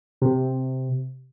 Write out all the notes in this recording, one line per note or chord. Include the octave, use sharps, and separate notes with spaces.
C3